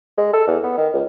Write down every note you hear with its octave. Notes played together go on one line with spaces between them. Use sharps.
G#3
A4
E2
B3
D#3
C#2